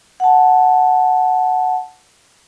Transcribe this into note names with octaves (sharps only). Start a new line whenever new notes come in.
F#5 A5